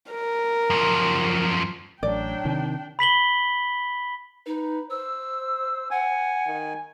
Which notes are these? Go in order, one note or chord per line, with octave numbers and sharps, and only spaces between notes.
A#4
F#2 F3
A1 F#3 D4 D5 G5
C3 D#3
B5 B6 F#7 G7
D#4 B4
C5 E6
F#5 G#5
D#3